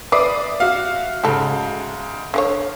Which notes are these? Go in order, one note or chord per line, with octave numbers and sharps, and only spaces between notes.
B4 D5 E5 D6 D#6 C7
F#4 E5 F5
G#2 C#3 G3 A4
D3 G4 C#5 F5